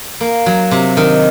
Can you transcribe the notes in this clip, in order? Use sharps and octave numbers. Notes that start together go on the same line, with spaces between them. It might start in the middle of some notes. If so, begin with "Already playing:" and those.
A#3
F#3
C3
D#3